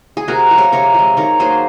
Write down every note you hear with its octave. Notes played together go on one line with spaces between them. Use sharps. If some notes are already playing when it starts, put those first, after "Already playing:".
G#4
C3 F#4 A#4
F3 G#3
A#4 C#5
C3 A#4 C#5
F3 G#3
D#3 A#4 C#5
F#3 A#3 G#4 C5